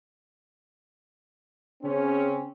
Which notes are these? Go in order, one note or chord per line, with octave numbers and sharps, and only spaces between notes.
C#3 C4 C#4